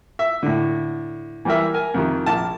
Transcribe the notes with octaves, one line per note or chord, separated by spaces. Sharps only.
E5
A2 D3
E3 G3 G4 A#4 E5
A#4 G#5
F2 C3 D#3
A#1 A5